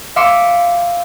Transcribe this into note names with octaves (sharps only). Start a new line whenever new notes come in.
E5 F5 C6 D6 C#7